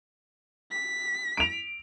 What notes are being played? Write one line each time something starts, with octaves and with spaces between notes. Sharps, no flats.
B6
D7 F7